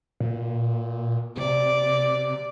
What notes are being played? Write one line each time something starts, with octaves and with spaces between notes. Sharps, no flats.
A#2
C3 D5